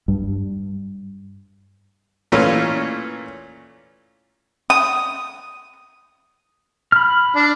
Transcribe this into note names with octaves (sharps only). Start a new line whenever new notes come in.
G2
A#2 E3 A3 C#4 F4
D#6
B5 F6
D4